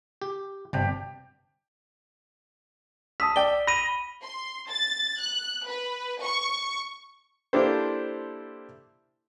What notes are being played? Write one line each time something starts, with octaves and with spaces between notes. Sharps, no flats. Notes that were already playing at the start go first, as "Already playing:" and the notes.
G4
G1 C3 D4 G4
A5 D#6 E6 B6
D5 G5 G7
B5 A#6 D#7
C6
A6
F#6
B4
C#6
A#3 D4 E4 G4 A4 C5